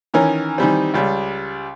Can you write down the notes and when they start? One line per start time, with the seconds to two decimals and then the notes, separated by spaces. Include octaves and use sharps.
0.14 D#3 E3 C#4 A#4
0.58 D#3 E3 G3 C4
0.94 C#2 G3